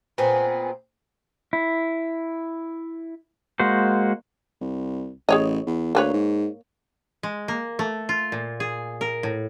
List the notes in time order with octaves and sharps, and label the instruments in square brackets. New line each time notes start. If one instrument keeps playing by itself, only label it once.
[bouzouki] A#2 B3 C4 G#4
[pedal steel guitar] E4
G#3 A#3 F#4 C5
[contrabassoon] C2
[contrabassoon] A1 [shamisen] G#4 C#5 D#5
[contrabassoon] E2
[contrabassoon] D2 [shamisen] A#3 B4 C#5
[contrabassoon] G#2
[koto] G#3
A#3
A3
F4
A#2
G#4
A#4
A2